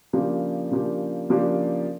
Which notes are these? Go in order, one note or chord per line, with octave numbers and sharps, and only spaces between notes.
C#3 F3 A#3 D4 G4
C#3 F3 A#3 D4 G4
C#3 F3 A#3 D4 G4